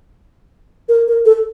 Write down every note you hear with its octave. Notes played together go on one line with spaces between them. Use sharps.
A#4
A#4
A4